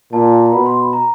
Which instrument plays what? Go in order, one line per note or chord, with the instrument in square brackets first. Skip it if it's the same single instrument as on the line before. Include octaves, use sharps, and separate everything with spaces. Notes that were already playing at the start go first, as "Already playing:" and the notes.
[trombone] A#2 [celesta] A5
[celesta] A#5
[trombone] B2 [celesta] B5
[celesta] C6
B5
A#5